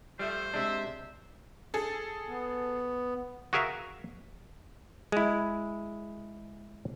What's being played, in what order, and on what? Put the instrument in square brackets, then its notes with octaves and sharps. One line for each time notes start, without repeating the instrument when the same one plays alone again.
[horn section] F3 A3 [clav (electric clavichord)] G3 E5 [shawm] C5
[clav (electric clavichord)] C3 G#3 D4 [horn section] E5
[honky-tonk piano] G#4 A4
[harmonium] B3
[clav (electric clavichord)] F#4 G#4 A#4 E5 F5
G#3 E4